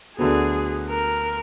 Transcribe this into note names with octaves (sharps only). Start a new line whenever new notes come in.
D2 D3 F#3 B3 G#4
A#4